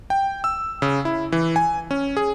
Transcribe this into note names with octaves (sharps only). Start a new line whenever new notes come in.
G5
E6
C#3
E4
E3
G#5
C#4
G#4